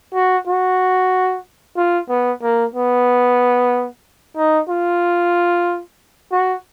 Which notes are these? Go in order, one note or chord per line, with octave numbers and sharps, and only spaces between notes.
F#4
F#4
F4
B3
A#3
B3
D#4
F4
F#4